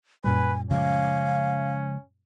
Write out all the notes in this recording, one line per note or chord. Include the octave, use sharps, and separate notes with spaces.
F#2 A#2 G3 B4 G#5
C#3 F3 G#3 C#4 F5